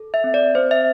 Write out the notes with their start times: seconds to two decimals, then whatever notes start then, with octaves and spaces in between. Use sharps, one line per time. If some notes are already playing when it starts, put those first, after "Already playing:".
Already playing: A4
0.14 E5
0.24 C4
0.34 D5
0.55 C4 C5
0.71 E5